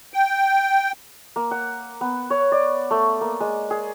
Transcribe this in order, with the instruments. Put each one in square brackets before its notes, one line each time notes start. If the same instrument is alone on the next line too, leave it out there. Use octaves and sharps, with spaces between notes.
[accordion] G5
[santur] A#3
F#5
B3
C#5
D5
A3
A#3
G#3
G#4